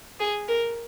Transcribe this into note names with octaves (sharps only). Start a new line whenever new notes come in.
G#4
A#4